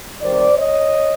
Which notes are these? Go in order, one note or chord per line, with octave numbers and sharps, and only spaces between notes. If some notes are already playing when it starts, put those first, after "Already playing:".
C3 D#3 G3 C5 D5
C#5 D#5